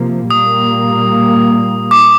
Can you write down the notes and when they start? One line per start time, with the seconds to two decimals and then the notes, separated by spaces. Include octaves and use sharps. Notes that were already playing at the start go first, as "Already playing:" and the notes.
Already playing: C3 F3 A#3
0.30 A#2 G3 A#3 D#6
1.91 D6